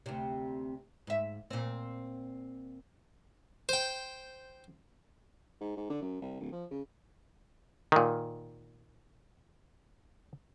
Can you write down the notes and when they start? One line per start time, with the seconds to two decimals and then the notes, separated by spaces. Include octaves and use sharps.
0.06 D2 C3
1.07 G#2 E5
1.50 A#2 C4
3.69 C5 G5
5.61 G#2
5.77 G#2
5.90 D3
6.02 F#2
6.21 C2
6.40 D1
6.52 F3
6.71 C#3
7.92 A#2 D#3